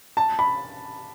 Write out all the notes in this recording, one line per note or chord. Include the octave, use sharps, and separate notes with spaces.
A5
B5